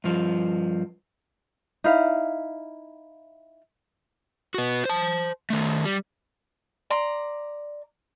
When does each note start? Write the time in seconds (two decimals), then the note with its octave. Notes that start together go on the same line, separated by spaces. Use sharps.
0.04 G2 F3
1.84 D#4 E4 F5
4.54 B3 F#4
4.85 C5 A5
5.50 D#3 A3
5.85 G3
6.90 D5 A#5 C6